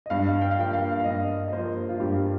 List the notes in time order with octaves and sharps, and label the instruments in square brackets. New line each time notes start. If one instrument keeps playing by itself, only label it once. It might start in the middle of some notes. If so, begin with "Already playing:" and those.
[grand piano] D#5
[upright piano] G2 [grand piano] F5
[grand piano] G5
F5
[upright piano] F3 A#3 [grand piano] G5
[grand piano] F5
F5
[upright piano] G2 [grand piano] D#5
[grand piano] D#5
[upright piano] F3 A#3 [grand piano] C5
[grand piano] F4
[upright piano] G2 [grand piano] G4